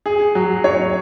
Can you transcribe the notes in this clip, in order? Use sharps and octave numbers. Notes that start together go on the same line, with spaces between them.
G#4
F#3
C#5